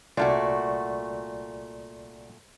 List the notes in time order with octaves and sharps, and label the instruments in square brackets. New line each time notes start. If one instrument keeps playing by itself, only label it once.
[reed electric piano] C2 D5 [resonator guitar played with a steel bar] A#2 A3 F#4